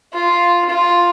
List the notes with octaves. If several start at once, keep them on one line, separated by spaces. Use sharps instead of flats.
F4
F4